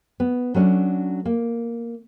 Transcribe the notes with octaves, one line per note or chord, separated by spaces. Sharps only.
B3
F#3 A3 C#4 D4
A#3